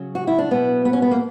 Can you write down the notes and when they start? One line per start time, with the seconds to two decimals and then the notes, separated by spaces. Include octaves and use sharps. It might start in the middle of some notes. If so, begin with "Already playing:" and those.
Already playing: C#3 F#3
0.15 F#4
0.27 E4
0.38 D4
0.51 B2 F#3 B3
0.85 B3
0.93 C#4
1.02 B3
1.11 A#3